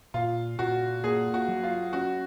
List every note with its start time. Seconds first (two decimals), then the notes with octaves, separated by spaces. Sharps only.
0.14 A#2 F4
0.59 A#2 F#4
1.04 A#3 G#4
1.34 F#4
1.48 F#3
1.63 F4
1.93 C#4 F#4